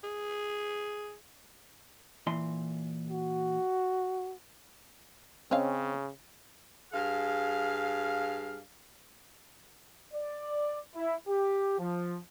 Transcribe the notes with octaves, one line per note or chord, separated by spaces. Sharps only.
G#4
A#2 E3 C6
F#4
C#3 C4 C#4 C#5 D#5 F5
G2 G#4 F5
D5
E4
G4
F3